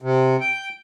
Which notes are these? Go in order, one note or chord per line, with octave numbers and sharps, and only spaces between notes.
C3
G5